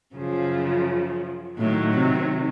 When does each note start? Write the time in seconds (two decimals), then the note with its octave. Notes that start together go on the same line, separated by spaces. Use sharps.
0.15 F#2 C#3 F3
1.57 A2 D#3 F#3
1.93 C3